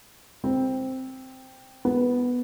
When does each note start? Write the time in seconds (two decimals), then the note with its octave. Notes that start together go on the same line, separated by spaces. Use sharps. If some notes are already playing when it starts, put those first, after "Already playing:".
0.44 C4
1.85 B3